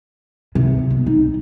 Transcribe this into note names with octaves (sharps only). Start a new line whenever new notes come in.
C3
B1
D#4